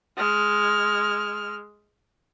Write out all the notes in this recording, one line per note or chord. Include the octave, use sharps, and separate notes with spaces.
G#3 F6